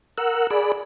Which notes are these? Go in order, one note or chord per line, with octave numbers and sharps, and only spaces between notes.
A#4 F#5 E6
G#4 D5 B5